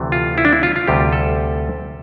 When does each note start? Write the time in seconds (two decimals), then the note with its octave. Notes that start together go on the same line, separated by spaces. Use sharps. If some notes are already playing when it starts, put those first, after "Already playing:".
Already playing: D2 C3 E3 A3
0.12 F4
0.38 E4
0.45 D4
0.53 E4
0.63 F4
0.76 F4
0.87 D2 C3 G3 G4
1.13 A4